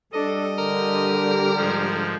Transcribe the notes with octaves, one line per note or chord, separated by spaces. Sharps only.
G3 D4 A4 D#5
D3 G4 A#4
G#2 F3